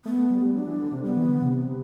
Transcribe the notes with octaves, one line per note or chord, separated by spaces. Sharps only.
A3 B3
A3
G3
G3
F#3 D4
E3
D3
C3
G3 B3
E3
D3
C3